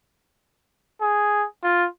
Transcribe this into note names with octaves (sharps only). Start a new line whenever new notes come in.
G#4
F4